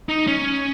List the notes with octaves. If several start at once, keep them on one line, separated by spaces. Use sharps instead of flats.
D#4
C#4